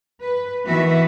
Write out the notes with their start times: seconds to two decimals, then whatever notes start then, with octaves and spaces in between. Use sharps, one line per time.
0.22 B4
0.67 D#3 E3 B3 F#4 B4 E5